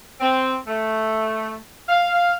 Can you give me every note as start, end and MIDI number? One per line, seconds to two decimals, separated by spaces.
0.20 0.56 60
0.67 1.55 57
1.89 2.34 77